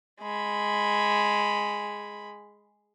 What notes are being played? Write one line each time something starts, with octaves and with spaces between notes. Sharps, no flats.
G#3 B5